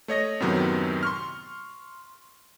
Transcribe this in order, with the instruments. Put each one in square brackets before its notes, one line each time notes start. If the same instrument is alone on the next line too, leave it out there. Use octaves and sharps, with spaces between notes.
[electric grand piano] A3 C#5 D#5 A#6
F#2 A2 C3 D#3 F#3 B3
C6 C#6 F6